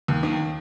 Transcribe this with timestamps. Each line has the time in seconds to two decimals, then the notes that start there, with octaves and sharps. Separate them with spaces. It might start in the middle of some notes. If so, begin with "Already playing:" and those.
0.08 D#2
0.23 D#3